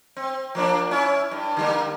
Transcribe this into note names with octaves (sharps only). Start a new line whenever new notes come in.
C4
F3 A#3 D4
C#4 E4
G2
D3 G3 A#3